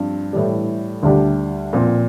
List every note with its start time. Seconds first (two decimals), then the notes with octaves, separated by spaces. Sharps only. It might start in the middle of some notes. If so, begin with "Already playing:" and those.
Already playing: G2 F3 C4 G4
0.33 A2 E3 G3
1.03 D2 D3 G3 D4 G4
1.73 A#2 F3 C4